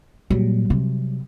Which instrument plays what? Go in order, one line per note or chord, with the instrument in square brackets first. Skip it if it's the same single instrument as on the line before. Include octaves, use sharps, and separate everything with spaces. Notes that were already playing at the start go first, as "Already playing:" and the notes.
[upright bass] A#2 [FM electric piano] F#3 G3
[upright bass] C3